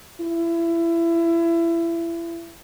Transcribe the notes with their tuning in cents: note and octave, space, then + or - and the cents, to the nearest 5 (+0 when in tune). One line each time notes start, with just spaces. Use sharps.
E4 +25